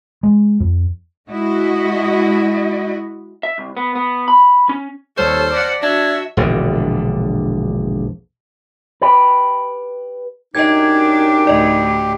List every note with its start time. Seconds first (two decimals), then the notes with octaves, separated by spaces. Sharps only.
0.23 G#3
0.60 F2
1.29 G#3 E4 F#4 D#5
3.43 E5
3.58 C2
3.77 B3
3.95 B3
4.28 B5
4.69 C#4
5.17 D#2 G3 A4 C5 C#5 F6
5.53 D5 F#5 A5 A#6 B6
5.82 D4 F#4 E5 G#6
6.37 E1 A#1 G2 D3
9.02 G4 B4
10.55 F#2 D4 D#4 G4 D#5 G#6
11.47 D2 A2 D5 D#5